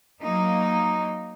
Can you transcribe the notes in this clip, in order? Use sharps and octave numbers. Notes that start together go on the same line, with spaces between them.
F#3 A#3 D#4